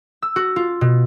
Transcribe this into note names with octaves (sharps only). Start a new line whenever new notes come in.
E6
F#4
F4
B2